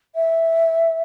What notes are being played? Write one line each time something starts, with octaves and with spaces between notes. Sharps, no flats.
E5